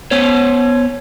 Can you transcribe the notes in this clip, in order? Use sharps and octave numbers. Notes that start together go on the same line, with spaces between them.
B3 C5 C#5